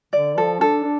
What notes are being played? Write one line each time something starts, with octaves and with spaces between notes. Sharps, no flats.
D3 D5
F3 A4
D4 A4
D4